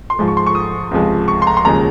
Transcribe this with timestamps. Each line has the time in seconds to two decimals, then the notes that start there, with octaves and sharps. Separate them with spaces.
0.10 C6
0.19 G#2 F3 G#3
0.28 C#6
0.37 C6
0.47 C#6
0.55 D#6
0.91 C#2 C3 F3 G#3
1.28 C#6
1.42 C6
1.47 A#5
1.57 C6
1.65 D#2 C#3 F3 G#3 A#5